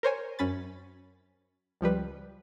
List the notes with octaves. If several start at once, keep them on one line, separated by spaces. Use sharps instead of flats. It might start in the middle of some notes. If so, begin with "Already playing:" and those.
A#4 C5 C#5 G#5
F#2 C#4 B5 A6
C#2 F3 G3 B4